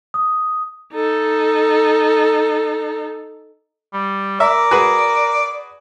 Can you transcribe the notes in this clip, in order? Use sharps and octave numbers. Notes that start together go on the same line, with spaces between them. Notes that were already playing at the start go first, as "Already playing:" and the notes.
D#6
D#4 A4
G3
A#4 D5 E5
F#4 G#4 B4